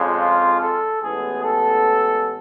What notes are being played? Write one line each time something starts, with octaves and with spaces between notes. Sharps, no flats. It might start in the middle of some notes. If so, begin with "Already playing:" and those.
Already playing: F2 C#3 G#3
F4
A4
A1 A2 G#3 B3 G#4
A4